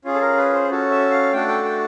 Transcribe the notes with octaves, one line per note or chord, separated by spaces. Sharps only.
C#4 F4 G#4
A4
A#4
B4
C5
C#4 F#4 A4
E5
F5
A3 D4 F#4 A4 G5
G5
G5